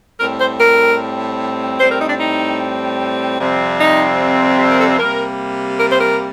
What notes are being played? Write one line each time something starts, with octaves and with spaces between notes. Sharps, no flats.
A2 G3 C4 A#4
C5
A#4
A2 G3 C4 C5
A#4
D#4
D4
D#4
F2 C3 G3 C4
D#4
G4
A#4
A4
C3 G3 A#3 A#4
A#4
C5
A#4